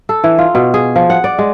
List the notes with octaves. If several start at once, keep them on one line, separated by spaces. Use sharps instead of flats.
A4
E3
F4
B2
G#4
F3
F#5
D5
G#3